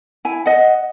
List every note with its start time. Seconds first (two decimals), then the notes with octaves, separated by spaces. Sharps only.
0.25 E4 G#5
0.46 D#5 F#5